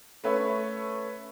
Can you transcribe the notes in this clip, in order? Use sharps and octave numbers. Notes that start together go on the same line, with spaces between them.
A3 C#4 B4 C#5 E5